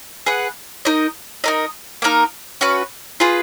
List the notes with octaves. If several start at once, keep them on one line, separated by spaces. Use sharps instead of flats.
G#4 B4 F#5
D#4 A#4 D#5
D#4 A#4 D#5
A#3 D#4 A#4
C#4 F#4 B4
F4 G#4 B4